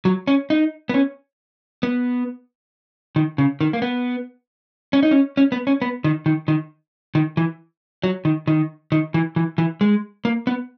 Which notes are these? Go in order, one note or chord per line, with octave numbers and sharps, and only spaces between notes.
F#3
C#4
D#4
B3
C#4
B3
D#3
C#3
D#3
A#3
B3
C#4
D#4
C#4
C#4
B3
C#4
B3
D#3
D#3
D#3
D#3
E3
F#3
D#3
D#3
D#3
E3
E3
E3
G#3
A#3
B3